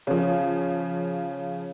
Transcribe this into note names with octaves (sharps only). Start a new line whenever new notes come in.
C#3 F3